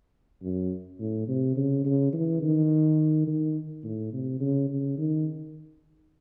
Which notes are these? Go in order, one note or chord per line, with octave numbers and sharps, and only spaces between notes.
F#2
A2
C3
C#3
C#3
E3
D#3
D#3
A2
C3
C#3
C#3
D#3